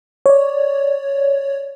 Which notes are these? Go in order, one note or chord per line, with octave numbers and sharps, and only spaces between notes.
C#5 D5